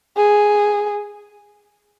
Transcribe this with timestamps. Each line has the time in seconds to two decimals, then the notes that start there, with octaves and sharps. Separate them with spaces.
0.17 G#4